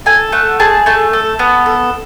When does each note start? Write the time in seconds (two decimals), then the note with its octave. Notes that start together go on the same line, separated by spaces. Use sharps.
0.06 A4 G#5
0.32 A3 F#5
0.60 G#4 A5
0.86 A3 A5
1.13 A4
1.39 B3
1.66 A4